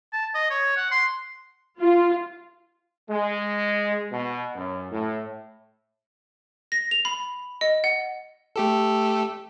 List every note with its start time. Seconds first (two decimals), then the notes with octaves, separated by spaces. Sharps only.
0.13 A5
0.35 D#5
0.50 C#5
0.77 F#5
0.91 C6
1.78 F4
3.10 G#3
4.12 B2
4.56 F#2
4.91 A2
6.72 A#6
6.91 F7
7.05 B5
7.61 D#5
7.84 F#5
8.56 A3 G4 A4